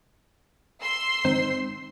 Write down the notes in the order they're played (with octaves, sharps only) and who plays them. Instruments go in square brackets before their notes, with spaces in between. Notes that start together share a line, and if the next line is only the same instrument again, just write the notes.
[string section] C6 E6 C7
[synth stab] G#2 D#3 C4